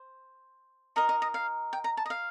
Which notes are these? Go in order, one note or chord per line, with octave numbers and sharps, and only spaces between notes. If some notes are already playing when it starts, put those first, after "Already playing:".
Already playing: C5
D#4 A#4 D#5
D#5
D#5
F5
G5
A#5
A5
D#5
F5